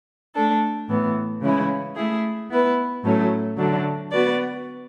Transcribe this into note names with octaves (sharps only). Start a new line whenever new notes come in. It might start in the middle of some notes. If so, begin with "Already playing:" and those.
A3 D4 A4
A2 E3 B3
C#3 E3 G#3 C#4 E4
A3 E4 G#4
B3 E4 B4
A2 F#3 A3 C#4
D3 F#3 A3 D4
B3 F#4 B4 D5